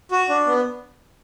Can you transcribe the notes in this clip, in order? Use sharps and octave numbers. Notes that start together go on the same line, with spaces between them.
F#4
D4
B3